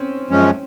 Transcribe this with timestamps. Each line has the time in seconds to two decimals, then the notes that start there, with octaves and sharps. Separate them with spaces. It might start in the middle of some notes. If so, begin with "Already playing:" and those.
Already playing: C4 C#4
0.30 F#2 F3 G#3 C#4